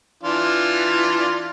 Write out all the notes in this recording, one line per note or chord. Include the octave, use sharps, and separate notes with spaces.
E3 D4 F4